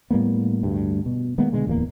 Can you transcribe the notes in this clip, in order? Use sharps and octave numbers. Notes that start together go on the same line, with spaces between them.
A2 G3 A#3 B3
D2 G2
B2
D#3 G#3 A#3 B3
B2 D3 G#3
D1 E2 F#3 A#3